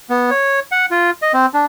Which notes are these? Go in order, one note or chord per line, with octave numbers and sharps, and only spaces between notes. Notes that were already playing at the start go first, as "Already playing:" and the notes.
B3
C#5
F#5
F4
D#5
C4
D4